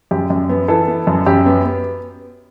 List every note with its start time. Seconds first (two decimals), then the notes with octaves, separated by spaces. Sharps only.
0.11 F#2 G4
0.30 F#2
0.49 B3
0.68 E3 A4
0.87 B3
1.07 F#2
1.26 F#2 G4
1.46 B3
1.65 B3